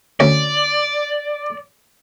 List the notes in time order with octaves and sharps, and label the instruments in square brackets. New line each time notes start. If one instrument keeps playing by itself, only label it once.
[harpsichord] D2 C#4 [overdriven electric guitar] D5